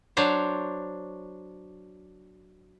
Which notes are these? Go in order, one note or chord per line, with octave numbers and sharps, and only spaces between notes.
F#3 D4 C5 C#5